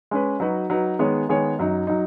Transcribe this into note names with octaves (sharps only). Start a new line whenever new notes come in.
G#3 C#4 B4
F#3 D#4 F#4 B4
F#3 D#4 F#4 B4
D#3 G#3 B3 G#4 C#5
D#3 G#3 B3 G#4 C#5
F#2 F#3 D#4
F#3 D#4